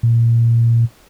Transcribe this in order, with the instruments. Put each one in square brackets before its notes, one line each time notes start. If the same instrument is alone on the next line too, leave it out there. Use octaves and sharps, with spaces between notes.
[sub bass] A#2